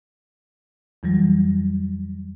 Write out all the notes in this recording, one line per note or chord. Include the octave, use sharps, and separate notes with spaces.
F2 E3 F#3 G3